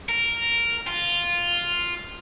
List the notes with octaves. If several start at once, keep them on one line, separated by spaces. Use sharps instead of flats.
A#4
F4